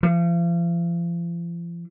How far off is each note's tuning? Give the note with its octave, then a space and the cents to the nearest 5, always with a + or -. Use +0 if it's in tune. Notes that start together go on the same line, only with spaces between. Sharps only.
F3 -40